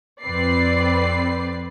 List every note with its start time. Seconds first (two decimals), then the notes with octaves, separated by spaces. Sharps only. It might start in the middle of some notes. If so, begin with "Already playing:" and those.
0.23 F2 C4 B4 D5 C7